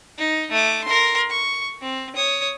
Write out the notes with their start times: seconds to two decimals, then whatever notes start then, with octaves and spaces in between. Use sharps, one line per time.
0.18 D#4
0.51 A3 D6
0.84 A#4 C6
1.30 C#6
1.81 C4
2.16 C#5 D#6